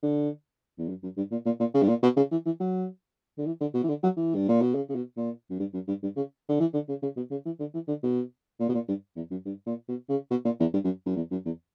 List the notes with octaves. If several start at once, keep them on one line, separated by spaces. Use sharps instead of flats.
D3
E2
F#2
F#2
G2
A#2
A#2
A#2
C#3
G2
A#2
B2
C#3
E3
E3
F#3
D3
E3
D3
B2
E3
D3
F#3
E3
G2
A#2
B2
C#3
C#3
B2
A#2
F#2
G2
F#2
G2
G2
C#3
D3
E3
D3
C#3
C#3
B2
C#3
E3
D3
E3
D3
B2
A#2
B2
A#2
G2
E2
F#2
G2
A#2
B2
C#3
B2
A#2
E2
G2
F#2
F#2
E2
F#2
E2